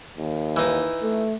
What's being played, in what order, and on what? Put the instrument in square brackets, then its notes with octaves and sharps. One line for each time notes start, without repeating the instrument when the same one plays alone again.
[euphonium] D#2
[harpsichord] E3 D#4
[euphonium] A3